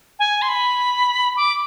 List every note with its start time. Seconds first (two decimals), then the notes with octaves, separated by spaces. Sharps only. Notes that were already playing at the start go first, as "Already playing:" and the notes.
0.19 G#5
0.42 C6
0.49 B5
1.36 D6